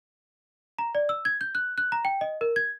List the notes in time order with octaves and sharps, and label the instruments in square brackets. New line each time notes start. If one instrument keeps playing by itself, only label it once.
[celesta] A#5
D5
E6
G#6
G6
F#6
F#6
A#5
G5
D#5
A#4
G#6